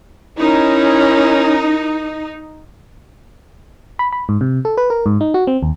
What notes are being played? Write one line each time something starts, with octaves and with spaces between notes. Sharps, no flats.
C#4 D#4 E4 A#4
B5
B5
G#2
C3
A4
B4
A#4
G#2
D#4
F#4
C4
D#2